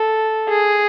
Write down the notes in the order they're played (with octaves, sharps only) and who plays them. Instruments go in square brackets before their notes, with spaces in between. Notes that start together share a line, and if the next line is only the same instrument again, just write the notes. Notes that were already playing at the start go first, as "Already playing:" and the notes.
Already playing: [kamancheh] A4
G#4